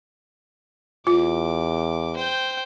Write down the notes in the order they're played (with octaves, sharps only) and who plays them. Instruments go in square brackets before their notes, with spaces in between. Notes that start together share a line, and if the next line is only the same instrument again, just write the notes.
[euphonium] E2 [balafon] F4 [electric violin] D6
[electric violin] C5 G5